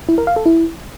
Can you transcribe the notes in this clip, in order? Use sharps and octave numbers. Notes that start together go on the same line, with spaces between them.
E4
A#4
F5
A4
E4